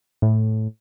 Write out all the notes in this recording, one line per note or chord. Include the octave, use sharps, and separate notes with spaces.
A2